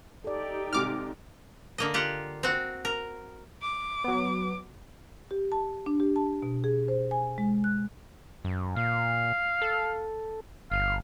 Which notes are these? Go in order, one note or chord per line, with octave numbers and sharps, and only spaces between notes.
D#4 G4 A4 D5
G#2 C3 D6 F6
D3 A#3 D#5
F4 G4 F#5
C4 F#4
A#4
D6
F#3 B3
G4
A5
D4
G4
A5
B2
G#4
C5
G#5
G#3
F#6
F#2
A#2 F5
A4
G1 F5